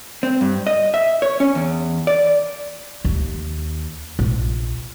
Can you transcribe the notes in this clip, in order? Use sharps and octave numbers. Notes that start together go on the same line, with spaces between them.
C4
G2
D#5
E5
C#5
C#4
E2
D5
D#2
A#1